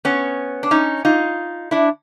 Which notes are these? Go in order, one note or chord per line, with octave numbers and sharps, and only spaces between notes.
B3 C#4
D4
C#4 D#4
D#4 F4
D4 E4